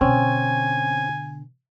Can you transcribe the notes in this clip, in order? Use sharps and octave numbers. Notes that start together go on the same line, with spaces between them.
B2 D3 C4 C#4 G#5